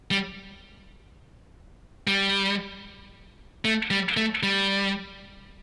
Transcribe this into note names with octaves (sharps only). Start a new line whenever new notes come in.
G3
G3
A3
G3
A3
G3